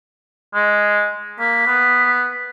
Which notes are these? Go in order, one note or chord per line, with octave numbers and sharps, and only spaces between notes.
G#3
A#3 B6
B3